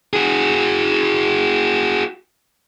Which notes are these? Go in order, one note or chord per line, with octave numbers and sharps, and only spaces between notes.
F#4 G#4